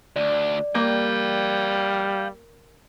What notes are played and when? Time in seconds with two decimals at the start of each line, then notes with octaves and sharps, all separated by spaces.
0.16 D2 D4 D5
0.75 G3 A#3 F5 G5